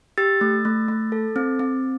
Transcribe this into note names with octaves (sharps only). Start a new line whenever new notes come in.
G4 E6 A6
A3
A3
A3
A4
C4
C4